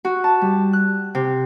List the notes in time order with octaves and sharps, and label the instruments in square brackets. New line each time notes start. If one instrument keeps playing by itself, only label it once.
[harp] F#4
A5
G3
F#6
C3